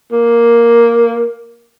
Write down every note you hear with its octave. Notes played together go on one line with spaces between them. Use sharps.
A#3